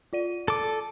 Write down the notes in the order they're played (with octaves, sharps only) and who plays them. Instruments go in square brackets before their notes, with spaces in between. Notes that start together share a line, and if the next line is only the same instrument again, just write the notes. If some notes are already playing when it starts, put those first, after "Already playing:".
[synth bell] F4 D5 D#7
[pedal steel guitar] A4 D6